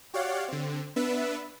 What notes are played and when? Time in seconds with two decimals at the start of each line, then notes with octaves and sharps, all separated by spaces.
0.14 F#4 G4 C#5 D5 F5 F#5
0.48 D3 C4
0.96 B3 D4 B4 E5